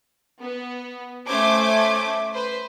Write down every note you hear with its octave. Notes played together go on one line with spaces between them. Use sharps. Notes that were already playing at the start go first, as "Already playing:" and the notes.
B3
A3 C#4 C5 D6 G#6
B4 C5